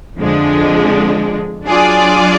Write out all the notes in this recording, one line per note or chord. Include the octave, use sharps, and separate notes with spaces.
F2 D3 F3 G#3 D4
F#3 D4 F4 G#4 D5